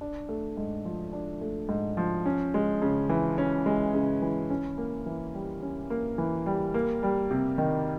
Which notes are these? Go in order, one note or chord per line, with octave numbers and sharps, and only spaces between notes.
D4
A3
G#2
F3
D4
A3
G#2
F3
C#4
G#3
C#3
E3
C#4
G#3
C#3
E3
C#4
A#3
E3
G3
C#4
A#3
E3
G3
A#3
G3
C3
D#3